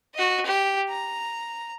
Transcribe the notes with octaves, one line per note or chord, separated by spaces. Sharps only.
F#4 D#5
G4
A#5